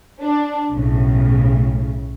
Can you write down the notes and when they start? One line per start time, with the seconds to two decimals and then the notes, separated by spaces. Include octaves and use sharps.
0.21 D4
0.71 B1 A2 C#3